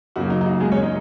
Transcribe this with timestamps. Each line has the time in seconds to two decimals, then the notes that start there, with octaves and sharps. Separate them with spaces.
0.16 F#2 C#3 F#3 A#3 F#4
0.30 D#4
0.41 D#4
0.46 F#4
0.60 G#3 G#4
0.72 C#4 C#5
0.83 D#4 D#5